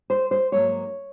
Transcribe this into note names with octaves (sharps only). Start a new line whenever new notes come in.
C5
C5
G#2 F#3 A#3 C#5